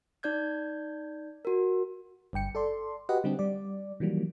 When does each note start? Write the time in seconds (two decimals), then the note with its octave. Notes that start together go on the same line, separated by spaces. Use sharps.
0.23 D#4 D5 G6 G#6
1.45 F#4 A#4
2.33 G1 G2 G5 C#7
2.55 A4 D5 C6
3.09 F#4 G4 B4 D#5 F#5
3.24 D3 G3 C4 D4 G4
3.39 G3 D5
4.00 D#3 E3 F#3 G3 A#3